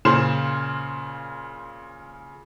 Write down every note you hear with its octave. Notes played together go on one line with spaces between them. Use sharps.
A#2 C#3 C5 C6 E7